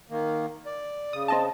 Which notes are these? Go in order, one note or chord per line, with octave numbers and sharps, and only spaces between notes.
D#3 A#3
D5
C#3 D#6
C4 D#5 A5